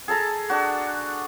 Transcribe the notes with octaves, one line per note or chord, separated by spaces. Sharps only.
G#4 A4 A5 A#5
D4 F#4